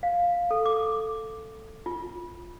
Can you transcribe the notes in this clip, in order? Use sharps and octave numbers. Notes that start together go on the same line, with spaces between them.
F5
A4
D6
F4